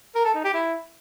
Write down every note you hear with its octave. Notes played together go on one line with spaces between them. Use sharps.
A#4
A4
D#4
G4
E4